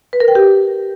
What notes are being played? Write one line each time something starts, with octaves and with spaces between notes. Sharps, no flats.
B4
A#4
G5
G4